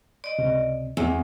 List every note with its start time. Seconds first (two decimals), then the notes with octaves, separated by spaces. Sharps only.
0.24 D5 D#5
0.38 C#2 C3
0.97 E2 C4 E5